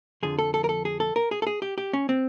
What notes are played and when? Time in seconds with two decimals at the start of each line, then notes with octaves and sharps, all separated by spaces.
0.23 F2 D3 F3 G#4
0.39 A4
0.54 A4
0.64 A#4
0.69 A4
0.85 G#4
1.00 A4
1.16 A#4
1.31 G#4
1.42 A4
1.47 G#4
1.62 G4
1.78 G4
1.93 C#4
2.09 C4